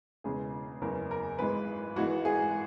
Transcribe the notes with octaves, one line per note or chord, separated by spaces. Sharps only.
E1 E2 C#3 G#3 G#4
F#1 E2 C#3 A#4
A#4
G#1 G#2 E3 G#3 B4
G#1 G#2 E3 G#3 F#4
G#4